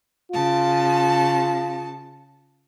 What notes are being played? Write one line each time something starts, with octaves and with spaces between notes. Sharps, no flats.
C#3 F4 A5